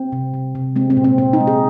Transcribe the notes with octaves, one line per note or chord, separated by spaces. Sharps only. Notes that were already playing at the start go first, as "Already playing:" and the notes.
Already playing: C4
C3
C3
C3
G#3 C4
C4
A#2
C4
A#2 C4
D#4
G#3
G#4